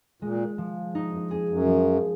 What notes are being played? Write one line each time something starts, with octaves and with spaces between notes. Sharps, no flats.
A#2 G#3
F3
G#2 D#4
F#2
F2 G#4
F#2
F3